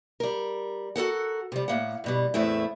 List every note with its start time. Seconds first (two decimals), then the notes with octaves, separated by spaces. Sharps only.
0.20 G3 A#4
0.96 F#4 A4 A#4 F#5
1.52 C3 G3
1.68 A2 A#3 F#5
2.04 G2 B2 G3
2.34 E2 A2 A3 C4 E4